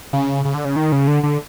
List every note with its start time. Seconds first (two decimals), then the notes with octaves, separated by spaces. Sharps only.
0.13 C#3
0.45 C#3
0.54 D3
0.65 C#3
0.76 D#3
0.92 C#3
1.08 D3
1.23 D3